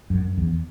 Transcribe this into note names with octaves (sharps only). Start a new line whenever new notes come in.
F#2
E2